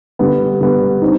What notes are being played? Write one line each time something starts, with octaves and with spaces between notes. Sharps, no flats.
D3 G3 B3
D3 G3 B3
C4 D#4